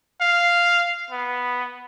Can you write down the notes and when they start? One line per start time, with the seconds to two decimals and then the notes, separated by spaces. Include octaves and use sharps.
0.21 F5
1.11 B3